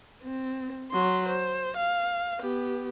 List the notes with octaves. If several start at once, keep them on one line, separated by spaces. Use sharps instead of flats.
C4
F#3 C6
C5
F5
B3 G4